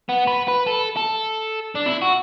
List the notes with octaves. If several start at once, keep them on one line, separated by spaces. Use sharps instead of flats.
B3
B4
B4
A4
A4
D4
E4
F#4